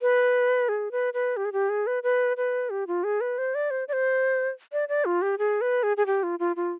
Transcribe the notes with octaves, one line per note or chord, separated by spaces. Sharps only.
B4
G#4
B4
B4
G4
G#4
G4
G#4
B4
B4
B4
G4
F4
G#4
B4
C5
D5
C5
D5
C5
D5
D5
F4
G4
G#4
B4
G#4
G#4
G4
F4
F4
F4